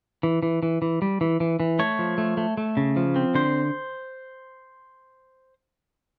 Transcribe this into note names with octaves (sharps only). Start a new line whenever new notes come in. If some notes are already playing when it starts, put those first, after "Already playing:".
E3
E3
E3
E3
G3
E3
E3
E3
A3 C#5
F3
A3
A3
A3
C#3
F3
C4
D3 C5